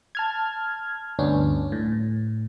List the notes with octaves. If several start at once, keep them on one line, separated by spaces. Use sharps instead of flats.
A5 F6 G#6
D2 G2 B3 C#4 D4
A2